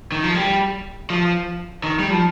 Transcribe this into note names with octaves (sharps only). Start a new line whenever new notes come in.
D#3
F3
G3
F3
D#3
G3
F3